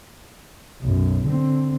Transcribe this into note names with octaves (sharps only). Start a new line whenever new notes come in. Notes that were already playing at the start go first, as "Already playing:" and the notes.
B1 F#2
D3 C4